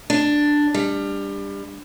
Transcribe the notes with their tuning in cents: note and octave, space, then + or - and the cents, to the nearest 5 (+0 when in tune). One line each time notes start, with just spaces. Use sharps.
D4 +5
G3 +25